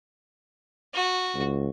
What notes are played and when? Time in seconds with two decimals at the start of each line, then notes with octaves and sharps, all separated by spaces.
0.94 F#4
1.34 C#2